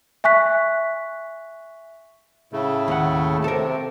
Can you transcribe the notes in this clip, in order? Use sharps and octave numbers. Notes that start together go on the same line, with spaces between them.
E5 G#5 C#6 F#6 B6
A2 C#3 A3
D#2 F#5
C3 A4 A#4